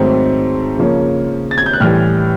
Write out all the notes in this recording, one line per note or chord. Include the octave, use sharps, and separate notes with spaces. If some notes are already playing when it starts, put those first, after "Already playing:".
Already playing: G#2 D#3 F#3 A3 C4
C#3 F3 A#3 C#4
A6
G#6
G6
F#6
A2 E3 G3 F6